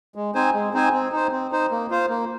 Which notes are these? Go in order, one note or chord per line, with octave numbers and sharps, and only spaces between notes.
G#3
C4 D#4 C5 G#5
G#3
C4 D#4 C5 G#5
C4
D#4 C5
C4
D#4 C5
A#3
F4 C5
A#3